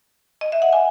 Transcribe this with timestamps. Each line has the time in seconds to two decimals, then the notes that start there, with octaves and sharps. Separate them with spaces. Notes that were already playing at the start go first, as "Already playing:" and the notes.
0.41 D#5
0.52 E5
0.62 F#5
0.73 G#5